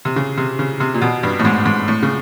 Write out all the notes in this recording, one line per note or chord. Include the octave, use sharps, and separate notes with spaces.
C3
C#3
C3
C#3
C3
A#2
B2
G2
A2
G#2
G#2
A2
C#3